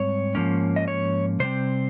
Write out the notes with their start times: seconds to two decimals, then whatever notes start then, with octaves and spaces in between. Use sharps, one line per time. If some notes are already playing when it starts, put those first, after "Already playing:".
Already playing: G#2 G3 C4 C#5
0.35 G#2 F3 A#3 C#4
0.76 D#5
0.88 C#5
1.40 C3 G3 C4 C5